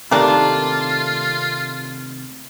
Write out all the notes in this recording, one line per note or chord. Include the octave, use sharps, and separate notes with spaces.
C3 D#3 A3 A#3 D4 F4